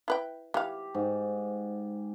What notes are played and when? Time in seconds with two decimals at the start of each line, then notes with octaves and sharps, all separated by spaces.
0.08 E4 B4 G5
0.54 E3 G4 F5
0.94 G#2